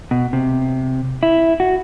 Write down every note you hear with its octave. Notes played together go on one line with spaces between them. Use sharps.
B2
C3
E4
F#4